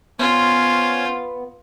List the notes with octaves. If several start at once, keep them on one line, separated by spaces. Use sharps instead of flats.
B3 C#4 F4 C5 C#5